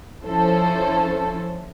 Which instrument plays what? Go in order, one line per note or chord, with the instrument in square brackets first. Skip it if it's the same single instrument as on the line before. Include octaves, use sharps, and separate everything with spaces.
[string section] F3 C#4 E4 A4 C5